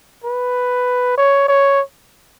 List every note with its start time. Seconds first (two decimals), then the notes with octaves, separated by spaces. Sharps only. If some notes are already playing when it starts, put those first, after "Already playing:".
0.24 B4
1.18 C#5
1.48 C#5